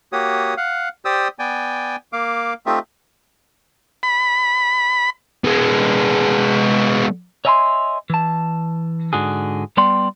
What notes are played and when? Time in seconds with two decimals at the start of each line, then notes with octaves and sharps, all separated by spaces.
0.13 A#3 F#4 G4 C#5 D#6
0.57 F5 F#5
1.05 G4 C5 D5 D#6 E6
1.39 B3 D5 G5 G#5
2.13 A#3 F5 D6
2.66 A3 C4 D#4 F4 G4 E5
4.03 B5
5.44 G#3 B3
7.45 C#5 D#5 E5 G#5 B5 C6
8.10 E3 A5
9.13 G#2 D3 F#4 G#4
9.77 G3 B3 D5 G5 C6